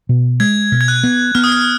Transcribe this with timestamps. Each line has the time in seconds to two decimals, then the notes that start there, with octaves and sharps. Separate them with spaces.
0.09 B2
0.40 G#3 G#6
0.72 B2
0.81 G#6
0.88 F#6
1.03 B3
1.35 B3 F6
1.44 D#6
1.52 F6